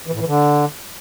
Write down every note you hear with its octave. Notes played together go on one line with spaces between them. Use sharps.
E3
A2
E3
D3